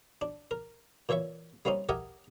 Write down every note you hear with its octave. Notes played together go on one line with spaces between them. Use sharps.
D4
A#4
A#2 E3 C#5 E5 C#6
G3 A#3 C4 C#4 D#4
G4 A#4 D#5 E5 F#5 G#5